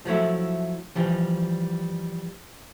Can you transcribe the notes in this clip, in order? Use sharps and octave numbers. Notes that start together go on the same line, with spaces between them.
F3 F#3 A3 E4
E3 F3 G3